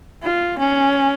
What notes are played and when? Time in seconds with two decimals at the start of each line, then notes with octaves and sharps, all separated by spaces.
0.23 F4
0.58 C#4